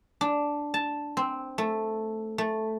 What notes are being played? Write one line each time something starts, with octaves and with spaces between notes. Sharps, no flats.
D4
A5
C4
A3
A3